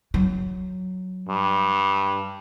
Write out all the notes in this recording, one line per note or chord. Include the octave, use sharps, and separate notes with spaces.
F#3
G2